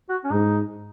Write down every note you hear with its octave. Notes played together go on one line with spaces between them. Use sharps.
F#4
C#4
G#2 D#4